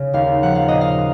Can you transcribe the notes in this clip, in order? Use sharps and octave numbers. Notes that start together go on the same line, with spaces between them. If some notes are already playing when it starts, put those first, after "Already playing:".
Already playing: C#3
D#2 F5
F3 F#5
F5
A#2 D#5
F5